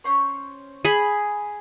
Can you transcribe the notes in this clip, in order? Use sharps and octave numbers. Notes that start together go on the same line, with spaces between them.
C#4 C5 C#5
G#4 B5